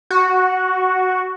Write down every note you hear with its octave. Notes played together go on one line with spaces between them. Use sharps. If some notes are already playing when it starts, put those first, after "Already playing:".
F#4